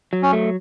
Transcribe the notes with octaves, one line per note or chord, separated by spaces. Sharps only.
F#3
C#4
A3